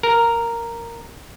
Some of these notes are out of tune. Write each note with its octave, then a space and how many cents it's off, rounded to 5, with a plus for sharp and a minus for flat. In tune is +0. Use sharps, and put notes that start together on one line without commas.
A#4 -5